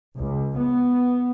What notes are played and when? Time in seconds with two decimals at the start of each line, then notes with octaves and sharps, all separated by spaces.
0.15 C#2
0.57 B3